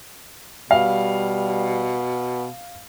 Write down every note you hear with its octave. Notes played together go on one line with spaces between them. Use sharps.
B2 G3 F5